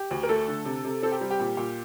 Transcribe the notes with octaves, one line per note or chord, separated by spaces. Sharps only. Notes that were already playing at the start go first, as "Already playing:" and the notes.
Already playing: G4
D2
A#4
A3 A4
D3
C3
C3
C4 A4
G4
G3
G4
A#2
A#2